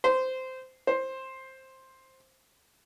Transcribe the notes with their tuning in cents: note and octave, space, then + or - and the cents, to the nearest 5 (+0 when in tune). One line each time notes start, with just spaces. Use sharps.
C5 -15
C5 +10